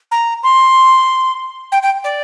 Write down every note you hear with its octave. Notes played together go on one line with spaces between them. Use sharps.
A#5
C6
G5
G5
D5